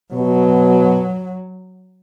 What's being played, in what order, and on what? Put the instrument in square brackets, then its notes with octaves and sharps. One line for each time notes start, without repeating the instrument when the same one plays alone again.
[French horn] B2 [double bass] F#3